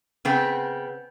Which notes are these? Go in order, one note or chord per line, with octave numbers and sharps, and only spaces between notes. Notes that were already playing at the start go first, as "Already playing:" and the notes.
C#3 B3 C4